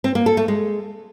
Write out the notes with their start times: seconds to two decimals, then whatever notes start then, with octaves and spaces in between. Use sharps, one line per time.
0.04 C4
0.15 A#3
0.26 A4
0.37 A3
0.48 G#3